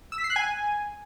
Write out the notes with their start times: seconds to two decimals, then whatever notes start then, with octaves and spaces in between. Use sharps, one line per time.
0.12 E6
0.18 B6
0.24 C7
0.30 F#6
0.36 G#5